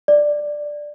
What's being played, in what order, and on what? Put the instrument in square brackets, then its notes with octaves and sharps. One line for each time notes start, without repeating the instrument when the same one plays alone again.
[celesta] D5